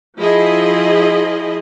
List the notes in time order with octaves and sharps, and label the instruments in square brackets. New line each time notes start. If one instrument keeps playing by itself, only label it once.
[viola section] F3 E4 G#4 D#5